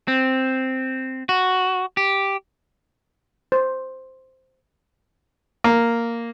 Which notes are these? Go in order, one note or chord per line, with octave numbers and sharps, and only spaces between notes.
C4
F#4
G4
C5
A#3